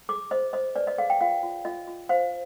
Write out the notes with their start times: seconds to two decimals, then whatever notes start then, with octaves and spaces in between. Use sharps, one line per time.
0.09 G#4 D6
0.31 C5 D#5
0.53 C5 D#5
0.76 B4 D5
0.87 D#5
0.98 G#4 F5
1.10 G5
1.21 F4 F5
1.43 F4
1.65 F4 D#5
1.87 F4
2.09 C5 F5